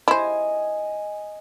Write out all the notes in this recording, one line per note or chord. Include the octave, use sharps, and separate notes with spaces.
E4 C5 D#5 G#5